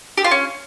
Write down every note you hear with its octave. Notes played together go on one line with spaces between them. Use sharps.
G4
F4
C#4